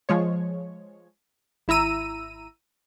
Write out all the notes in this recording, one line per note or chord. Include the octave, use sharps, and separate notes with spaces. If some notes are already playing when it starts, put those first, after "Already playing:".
F3 G#3 C#5
G#1 E4 A#5 E6 D#7